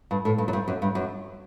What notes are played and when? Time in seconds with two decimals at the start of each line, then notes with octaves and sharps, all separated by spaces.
0.11 G2
0.25 A2
0.38 G2
0.48 F#2
0.53 G2
0.68 F#2
0.82 G2
0.95 F#2